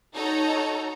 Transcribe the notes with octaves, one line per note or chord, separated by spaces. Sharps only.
D#4 F#4 A4 C#5 A#5